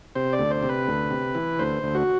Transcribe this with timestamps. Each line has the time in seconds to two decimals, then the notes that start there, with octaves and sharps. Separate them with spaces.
0.15 C3 C5
0.33 D5
0.39 D2
0.51 C5
0.63 C3
0.69 B4
0.87 D2
1.11 C3
1.35 E3
1.59 D2 C5
1.83 D2
1.95 F#4